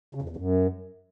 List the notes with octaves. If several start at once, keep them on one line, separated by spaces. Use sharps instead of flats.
C#3
F2
E2
F#2